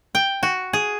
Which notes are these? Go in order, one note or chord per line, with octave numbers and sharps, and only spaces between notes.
G5
F#4
G#4